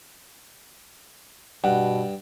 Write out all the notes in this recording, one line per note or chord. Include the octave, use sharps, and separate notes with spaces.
G2 B2 F#5